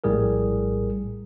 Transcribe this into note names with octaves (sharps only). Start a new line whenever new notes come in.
A#1 A2 G3 G#4 A#4